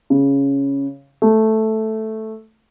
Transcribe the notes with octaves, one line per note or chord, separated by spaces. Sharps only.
C#3
A3